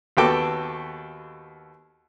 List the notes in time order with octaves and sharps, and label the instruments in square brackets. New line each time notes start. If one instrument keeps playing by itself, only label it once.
[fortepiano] D#2 B3 F#4 A4 G5 D6